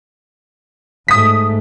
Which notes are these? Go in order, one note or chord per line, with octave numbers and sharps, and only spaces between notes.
G#2 A3 D#6 B6